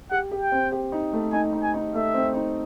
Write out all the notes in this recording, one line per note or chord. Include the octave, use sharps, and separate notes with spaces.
G4 F#5
G4
G5
C4
G4
D#4
A3
D#4 G#5
D#4
G#5
D#4
A3 E5
C4
D#4